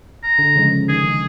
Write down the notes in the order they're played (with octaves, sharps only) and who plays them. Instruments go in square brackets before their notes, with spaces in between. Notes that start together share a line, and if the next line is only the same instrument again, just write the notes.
[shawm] A#5
[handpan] D3
C#3 F3 G#3
[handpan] D#3 [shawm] G#4